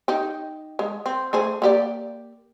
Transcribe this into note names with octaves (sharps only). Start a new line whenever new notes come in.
D#4 G4
G#3
C4
A3 G#4 C5
A#3 G4 D5